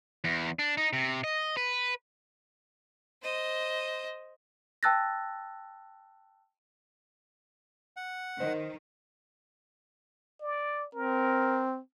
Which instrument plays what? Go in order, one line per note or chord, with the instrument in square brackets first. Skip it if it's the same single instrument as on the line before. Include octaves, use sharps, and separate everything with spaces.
[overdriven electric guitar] E2
D4
D#4
C3
D#5
B4
[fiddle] C5 D#5
[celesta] G5 A5 E6 F#6 A6 A#6
[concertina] F#5
[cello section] D#3 [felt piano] C5 D#5
[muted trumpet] D5
[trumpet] C4 [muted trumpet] A#4